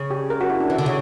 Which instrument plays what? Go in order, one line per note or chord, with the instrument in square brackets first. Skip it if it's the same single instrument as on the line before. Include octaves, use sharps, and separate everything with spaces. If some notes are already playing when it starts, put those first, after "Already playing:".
Already playing: [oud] C#3
[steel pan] G4
A#4
F#4
E4
D4
[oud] E3
D3
C#3